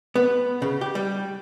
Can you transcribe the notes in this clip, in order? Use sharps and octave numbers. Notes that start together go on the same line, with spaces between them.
B3
C#3
G4
G3